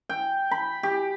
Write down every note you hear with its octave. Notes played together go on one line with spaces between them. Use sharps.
G5
B5
G4